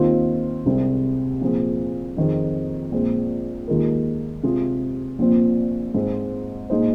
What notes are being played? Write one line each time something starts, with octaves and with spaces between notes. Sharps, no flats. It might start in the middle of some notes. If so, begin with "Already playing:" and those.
Already playing: D#2 D#3 C4 F4
C2 C3 G#3 C4
A#2 F3 C4 G#4
F2 D#3 C4 G#4
A#1 A#2 G#3 C4
D#2 D#3 G#3 F4 A#4
C3 G#3 F4 G#4
A#1 A#2 F3 C4
G#2 G#3 C4
A#2 G#3 D#4 C5